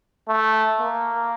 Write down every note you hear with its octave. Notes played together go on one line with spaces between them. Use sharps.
A3
A#3